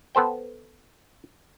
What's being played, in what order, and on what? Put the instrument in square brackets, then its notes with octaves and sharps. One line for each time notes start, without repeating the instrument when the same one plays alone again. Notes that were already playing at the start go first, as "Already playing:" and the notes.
[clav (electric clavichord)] B3 A4 C5 G5